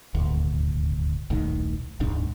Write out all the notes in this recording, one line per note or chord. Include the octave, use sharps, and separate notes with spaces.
D#1 G#1 D2
D#1 B1 A2 D#3
D1 B1 G#2 D4